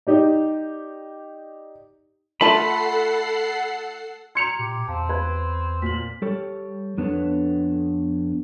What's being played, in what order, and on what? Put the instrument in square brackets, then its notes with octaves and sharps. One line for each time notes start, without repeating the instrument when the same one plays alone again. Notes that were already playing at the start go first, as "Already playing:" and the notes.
[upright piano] D#4 G4 D5
[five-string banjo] A3 F4 A5 [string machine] A4 F#5 C7 [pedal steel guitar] B5
[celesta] A#5 G6 G#6 [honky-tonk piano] C6 C#7 F7
[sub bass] A#2 [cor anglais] G4
[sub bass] E2 [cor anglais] C4 [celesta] F5 A5
[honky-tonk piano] B4 [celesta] G#6
[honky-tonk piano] A#2 [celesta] B6 F#7
[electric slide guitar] G3 G4 A4 C#5
F2 B3 D4 A4 B4 C#5